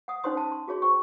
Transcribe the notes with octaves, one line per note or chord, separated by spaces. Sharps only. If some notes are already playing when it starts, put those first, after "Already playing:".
F#5 D#6
C#4 D#4 C5 C#5 C6 D#6
A5
C6
F#4 G#4 C#5 C6
C5 G5 C#6